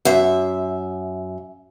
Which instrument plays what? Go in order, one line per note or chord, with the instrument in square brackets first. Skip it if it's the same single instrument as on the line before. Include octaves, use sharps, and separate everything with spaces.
[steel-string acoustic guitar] F#2 E5